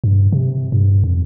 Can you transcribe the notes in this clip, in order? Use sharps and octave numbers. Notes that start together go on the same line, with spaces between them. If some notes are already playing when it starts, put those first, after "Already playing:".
G2
C3
G2
F2